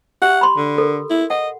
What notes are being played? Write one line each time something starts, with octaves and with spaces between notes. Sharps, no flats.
G4 F#5
B5 C6
D3
A4 A#4
E4
D#5 F#5